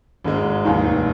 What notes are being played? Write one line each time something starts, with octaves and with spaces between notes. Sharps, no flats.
G#1 G#2 G#3
F1 D#2 D#3